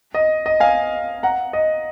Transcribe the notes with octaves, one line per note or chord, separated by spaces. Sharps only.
D#5
D#5
F5 G#5
F#5 A#5
D#5